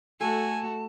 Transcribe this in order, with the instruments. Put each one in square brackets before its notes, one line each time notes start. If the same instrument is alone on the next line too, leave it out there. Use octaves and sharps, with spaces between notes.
[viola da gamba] A3 F#4 [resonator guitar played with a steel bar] A4 [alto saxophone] G#5 [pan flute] A5